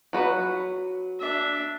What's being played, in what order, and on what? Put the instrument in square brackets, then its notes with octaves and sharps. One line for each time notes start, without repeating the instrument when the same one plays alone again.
[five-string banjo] F#3 F#4 B4
[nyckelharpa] D4 E5